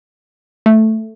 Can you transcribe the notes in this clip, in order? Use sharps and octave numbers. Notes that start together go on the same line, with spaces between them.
A3